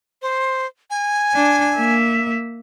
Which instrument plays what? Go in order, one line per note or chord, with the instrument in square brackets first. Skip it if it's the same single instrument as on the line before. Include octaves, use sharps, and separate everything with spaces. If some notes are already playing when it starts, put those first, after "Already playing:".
[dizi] C5
G#5
[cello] D4
A#3 E5